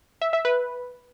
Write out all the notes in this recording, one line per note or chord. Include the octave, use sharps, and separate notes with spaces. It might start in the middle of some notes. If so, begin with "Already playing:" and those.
E5
E5
B4